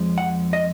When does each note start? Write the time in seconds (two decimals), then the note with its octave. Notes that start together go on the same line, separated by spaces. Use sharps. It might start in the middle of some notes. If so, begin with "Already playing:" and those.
Already playing: F2 F3 G#3
0.18 F#5
0.53 D#5